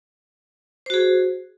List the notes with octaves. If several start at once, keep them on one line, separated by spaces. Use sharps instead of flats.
F#4 G#4 C5